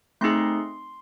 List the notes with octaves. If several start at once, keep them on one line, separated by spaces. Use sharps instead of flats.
A3 C4 D#4 G#4 C6